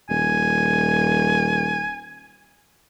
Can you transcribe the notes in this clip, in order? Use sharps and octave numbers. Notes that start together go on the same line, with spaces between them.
D#1 G#5